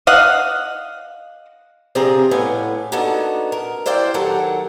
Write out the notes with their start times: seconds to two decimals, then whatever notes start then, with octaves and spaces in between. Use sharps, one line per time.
0.07 D#5 F5 F#5
1.95 C3 F3 C4 D4 G#4 A#5
2.31 F2 A2 B3 D4 G#5
2.92 A#3 B3 D4 D#4 F#4 A4
3.52 A#4
3.86 E4 C5 D5 F5 G5
4.14 D#2 F#3 A4 A#4 F#5